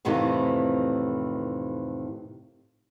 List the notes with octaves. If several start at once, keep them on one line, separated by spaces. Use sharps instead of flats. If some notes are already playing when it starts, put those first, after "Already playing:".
F2 A2 C3 D#3 E3